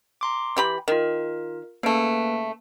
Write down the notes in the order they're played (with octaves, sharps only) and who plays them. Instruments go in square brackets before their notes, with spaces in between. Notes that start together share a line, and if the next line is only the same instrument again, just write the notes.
[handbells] A#5 C6 D6
[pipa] E3 G4 B5
[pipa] D#3 [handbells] F4 A#4
[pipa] C#3 A3 [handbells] A#3 B4 D7